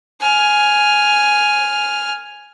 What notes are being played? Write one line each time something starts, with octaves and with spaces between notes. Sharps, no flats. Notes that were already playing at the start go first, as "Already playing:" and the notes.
G#5 F6